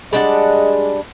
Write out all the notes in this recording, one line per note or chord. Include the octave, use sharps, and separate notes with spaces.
G3 G#3 D4 D#5 F#5